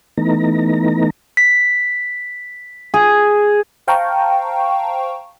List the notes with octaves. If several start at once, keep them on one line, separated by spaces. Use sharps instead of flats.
E3 A3 B3 D#4 A#5
B6
G#4
C5 F5 G5 A5 A#5 C#6